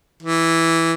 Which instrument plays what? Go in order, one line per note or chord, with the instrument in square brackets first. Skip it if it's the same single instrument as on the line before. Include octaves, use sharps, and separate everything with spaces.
[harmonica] E3